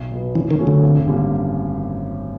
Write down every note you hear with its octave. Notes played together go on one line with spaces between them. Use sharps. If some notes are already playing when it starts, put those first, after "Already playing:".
Already playing: B1
B2 F#3 B3
F#2 E3
D#3
C#3 F#3 A3 C#4
D3
G#1
F#2 D3 G3 A#3